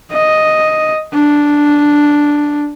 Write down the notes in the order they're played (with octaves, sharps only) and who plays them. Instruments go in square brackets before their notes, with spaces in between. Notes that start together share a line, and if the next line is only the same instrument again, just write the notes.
[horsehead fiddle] D#5
D4